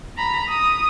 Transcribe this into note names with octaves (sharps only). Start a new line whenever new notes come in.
A#5 B5
D#6